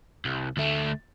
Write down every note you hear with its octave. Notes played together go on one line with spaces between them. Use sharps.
C2
D2 A3